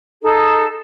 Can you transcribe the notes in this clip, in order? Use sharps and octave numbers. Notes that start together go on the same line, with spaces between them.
D#4 G#4 A4